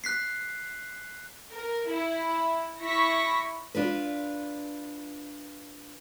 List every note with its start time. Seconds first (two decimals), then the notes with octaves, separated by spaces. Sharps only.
0.04 F#6 B6 C7
1.53 A#4
1.90 E4
2.83 E4 C#6 A#6 B6
3.75 D4 F4 B4